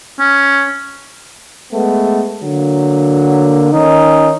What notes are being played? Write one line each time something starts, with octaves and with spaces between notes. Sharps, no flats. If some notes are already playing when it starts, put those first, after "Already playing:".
C#4
G#3 A3 B3
D3 F#3 A#3
D#3 C#4 D#4